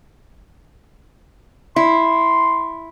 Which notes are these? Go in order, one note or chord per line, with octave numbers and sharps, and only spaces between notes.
E4 C6